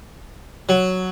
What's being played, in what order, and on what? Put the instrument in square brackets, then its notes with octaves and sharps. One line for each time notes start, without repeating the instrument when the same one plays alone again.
[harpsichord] F#3